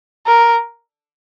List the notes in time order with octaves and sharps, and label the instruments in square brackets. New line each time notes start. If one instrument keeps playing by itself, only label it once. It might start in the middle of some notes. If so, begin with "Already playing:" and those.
[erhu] A#4